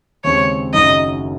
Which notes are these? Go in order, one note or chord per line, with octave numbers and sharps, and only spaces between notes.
D#2 C#3 G#3 C4 C#5
F#1 F#2 D#3 F#3 D#5